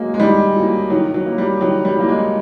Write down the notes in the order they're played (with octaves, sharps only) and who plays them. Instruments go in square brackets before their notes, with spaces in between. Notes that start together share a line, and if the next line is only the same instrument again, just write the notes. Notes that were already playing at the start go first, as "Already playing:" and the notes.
Already playing: [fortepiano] F#3 A#3 [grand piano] G#3
[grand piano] G#3
[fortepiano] D#3 [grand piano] G3
[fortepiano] F#3 A#3
[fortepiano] D#3 [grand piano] F#3
[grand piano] F#3
[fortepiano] F#3 A#3
[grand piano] G3
[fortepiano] D#3 [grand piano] F#3
[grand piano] G3
[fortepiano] F#3 A#3
[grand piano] G#3